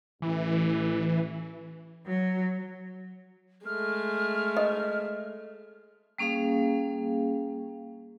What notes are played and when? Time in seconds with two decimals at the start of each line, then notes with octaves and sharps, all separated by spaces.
0.22 A1 E3
2.05 F#3
3.66 G#3 A3 F6
4.57 D#5
6.18 G3 A#3 C#4 G#4 F5